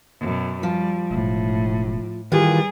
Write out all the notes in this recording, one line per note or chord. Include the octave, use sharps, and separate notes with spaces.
F#2 B2
F3 G3
E1 A2
D#3 E3 G3 F4 G4 G#4